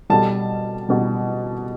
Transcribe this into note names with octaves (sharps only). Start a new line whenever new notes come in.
B2 G3 A5
B2 G3